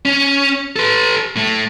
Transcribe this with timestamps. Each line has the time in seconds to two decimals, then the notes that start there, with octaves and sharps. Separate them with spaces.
0.05 C#4
0.76 A4 B4
1.36 A2 A3